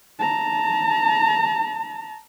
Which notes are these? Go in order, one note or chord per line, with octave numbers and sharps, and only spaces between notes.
A5 A#5